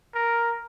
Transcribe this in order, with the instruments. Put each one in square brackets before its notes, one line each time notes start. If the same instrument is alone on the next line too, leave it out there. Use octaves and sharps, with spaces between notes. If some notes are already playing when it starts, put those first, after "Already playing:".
[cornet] A#4